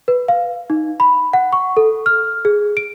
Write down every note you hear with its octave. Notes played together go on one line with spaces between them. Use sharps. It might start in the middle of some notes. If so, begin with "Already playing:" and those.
B4
F5
D#4
B5
F#5
C#6
A4
F6
G#4
D7